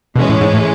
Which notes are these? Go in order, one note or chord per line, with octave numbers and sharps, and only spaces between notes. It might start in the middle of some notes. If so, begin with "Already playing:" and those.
B2 E3 G#3 C#4
A2
G#2
A2